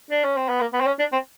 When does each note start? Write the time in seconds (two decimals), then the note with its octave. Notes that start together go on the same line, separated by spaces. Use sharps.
0.11 D4
0.24 C#4
0.37 C4
0.49 B3
0.61 A#3
0.73 B3
0.81 C4
0.87 C#4
0.99 D4
1.12 C4